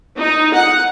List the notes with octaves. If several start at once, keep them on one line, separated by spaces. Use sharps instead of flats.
D#4
F#5